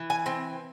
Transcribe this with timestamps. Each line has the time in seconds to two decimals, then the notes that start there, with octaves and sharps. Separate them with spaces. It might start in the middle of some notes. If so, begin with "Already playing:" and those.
Already playing: E3
0.10 G#5
0.26 C4 G5